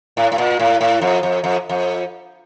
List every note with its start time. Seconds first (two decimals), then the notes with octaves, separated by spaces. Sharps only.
0.17 A2
0.32 A2
0.38 A#2
0.59 A2
0.81 A2
1.02 F2
1.23 F2
1.44 F2
1.69 F2